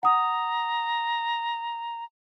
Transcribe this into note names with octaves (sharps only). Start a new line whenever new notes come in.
F#5 A#5 D#6